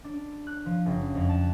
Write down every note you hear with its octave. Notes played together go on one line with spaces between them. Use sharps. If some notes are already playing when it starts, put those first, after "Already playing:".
D4
F#6
F3
F#1
F2
A5